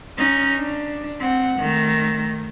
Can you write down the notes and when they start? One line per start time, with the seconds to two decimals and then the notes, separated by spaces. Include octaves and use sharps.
0.17 C#4 D#4
0.59 D4
1.20 C4 F#5
1.60 D#3 A3